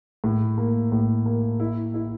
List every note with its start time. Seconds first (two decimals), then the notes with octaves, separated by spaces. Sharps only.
0.24 A2
0.58 A#3
0.92 A2
1.26 A#3
1.60 E4
1.94 E4